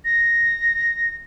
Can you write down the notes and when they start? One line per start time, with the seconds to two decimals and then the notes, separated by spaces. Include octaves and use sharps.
0.05 A#6